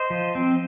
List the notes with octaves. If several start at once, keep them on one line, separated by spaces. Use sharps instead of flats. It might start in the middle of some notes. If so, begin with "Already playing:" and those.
Already playing: C5 D#5
F3
C4